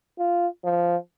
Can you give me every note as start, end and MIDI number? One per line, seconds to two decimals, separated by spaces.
0.18 0.47 65
0.64 0.97 53